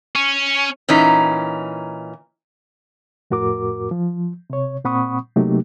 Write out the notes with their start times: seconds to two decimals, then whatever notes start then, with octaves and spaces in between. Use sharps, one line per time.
0.15 C#4
0.89 A#2 E3 C#4 D#4
3.31 F2 A2 F#4 A#4 D6
3.91 F3
4.50 C3 C#5
4.84 A#2 C4 F#5 B5 C#6 D#6
5.36 C3 F#3 A3 A#3 D#4 G4